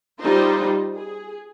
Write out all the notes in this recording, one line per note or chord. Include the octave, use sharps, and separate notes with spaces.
G3 D#4 F4 C5
G#4